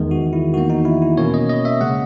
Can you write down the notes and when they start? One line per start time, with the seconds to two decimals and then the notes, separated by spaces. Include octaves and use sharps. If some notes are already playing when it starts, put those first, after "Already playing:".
Already playing: E2 D#3 G#3
0.11 F#4
0.33 E4
0.53 E2 D#3 A#3 F#4
0.70 D#4
0.85 E4
1.02 E4
1.17 B2 A#3 C#4 C#5
1.34 D#5
1.49 D#5
1.65 E5
1.81 C#3 G#3 F#5